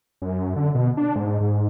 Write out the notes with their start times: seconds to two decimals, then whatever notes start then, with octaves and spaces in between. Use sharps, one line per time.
0.22 F#2
0.56 D3
0.75 B2
0.97 D4
1.16 G#2
1.40 G#2